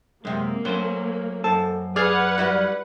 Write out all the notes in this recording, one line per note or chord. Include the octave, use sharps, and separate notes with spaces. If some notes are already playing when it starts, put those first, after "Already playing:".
F#2 C3 G#3 A#3
F#3 A3 C#4 C5
F#2 A4 C5 A5
G#4 B4 D5 F#5 F6 G#6
G3 E4 F#4